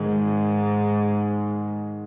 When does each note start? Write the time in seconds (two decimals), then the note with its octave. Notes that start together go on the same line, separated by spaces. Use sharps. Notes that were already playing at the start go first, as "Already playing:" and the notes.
Already playing: G#2 D#3 G#3